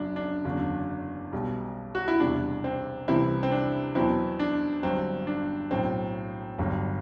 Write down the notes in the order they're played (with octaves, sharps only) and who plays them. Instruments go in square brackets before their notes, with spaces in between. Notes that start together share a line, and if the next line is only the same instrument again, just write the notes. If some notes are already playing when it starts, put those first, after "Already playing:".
Already playing: [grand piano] F#1 F#2 F#3 D4
D4
F#1 E2 D3 F#3
B1 B2 G3
F#4
E4
E1 E2 C3 G3 D4
C4
C2 C3 E3 G3 C4 E4
C4
D4
E2 B2 F#3 C4 E4
D4
G1 G2 F#3 C4
D4
B1 A2 F#3 C4
G1 G2 F#3